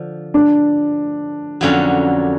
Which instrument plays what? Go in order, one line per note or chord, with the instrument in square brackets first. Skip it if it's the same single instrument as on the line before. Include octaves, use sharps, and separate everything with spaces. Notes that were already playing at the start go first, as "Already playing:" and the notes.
Already playing: [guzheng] D3 F3
[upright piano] D4
[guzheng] F2 D3 F#3 A#3 C#4